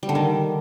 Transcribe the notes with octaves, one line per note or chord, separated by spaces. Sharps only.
G3
D3
D#3